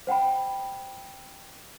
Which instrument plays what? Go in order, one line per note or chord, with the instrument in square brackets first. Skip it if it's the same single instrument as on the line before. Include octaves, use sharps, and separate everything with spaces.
[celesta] C5 F#5 G5 B5